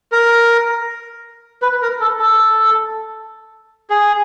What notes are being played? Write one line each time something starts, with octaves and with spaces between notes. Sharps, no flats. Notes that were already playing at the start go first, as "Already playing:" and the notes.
A#4
B4
A#4
A4
A4
G#4